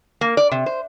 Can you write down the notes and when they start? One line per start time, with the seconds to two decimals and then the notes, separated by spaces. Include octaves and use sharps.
0.21 A#3
0.37 D5
0.51 C3
0.66 C5